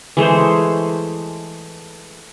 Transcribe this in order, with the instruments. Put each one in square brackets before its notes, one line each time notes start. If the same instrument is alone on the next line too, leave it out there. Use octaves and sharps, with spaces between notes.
[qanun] E3 G#3 A3 C5